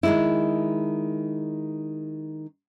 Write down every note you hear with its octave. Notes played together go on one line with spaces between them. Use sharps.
D#3 G#3 E4